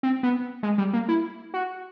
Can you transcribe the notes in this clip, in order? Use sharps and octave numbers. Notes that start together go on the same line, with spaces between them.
C4
B3
G#3
G3
A#3
E4
F#4